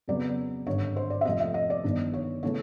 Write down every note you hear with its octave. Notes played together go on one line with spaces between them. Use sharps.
F2 C#3 F#3 B3 D5
G#1 G2 D3 C#5
C5
D5
E5
F2 C3 F3 A3 D#5
E5
D#5
D5
G1 G2 D#3
C#5
C#3 E3 A3 C#5